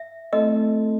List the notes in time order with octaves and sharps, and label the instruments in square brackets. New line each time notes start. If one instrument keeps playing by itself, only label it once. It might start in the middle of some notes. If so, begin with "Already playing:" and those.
Already playing: [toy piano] E5
[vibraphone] A3 C4 E4 A4 [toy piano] D#5